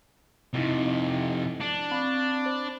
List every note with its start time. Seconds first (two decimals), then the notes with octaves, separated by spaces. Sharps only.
0.54 F2 C3 D#4 E4 D#5
1.61 D4
1.91 C4 F5 B5
2.46 C5